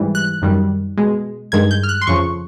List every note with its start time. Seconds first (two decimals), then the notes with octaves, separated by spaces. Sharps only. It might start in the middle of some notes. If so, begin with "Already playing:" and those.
Already playing: G#2 E3 G3
0.15 F#6
0.42 F#2 D#3 G3
0.97 B2 G#3
1.52 G2 D#3 G#3 G#6
1.71 G6
1.83 F6
1.89 F#6
2.01 C6
2.07 F2 C#3 F3 C#6